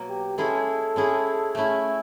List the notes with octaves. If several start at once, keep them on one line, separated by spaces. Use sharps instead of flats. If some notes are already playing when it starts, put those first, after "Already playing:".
Already playing: B2 F#3 A#3
G4
G#3 C#4 E4 G#4 A4
G#3 C#4 E4 G#4
A3 C#4 E4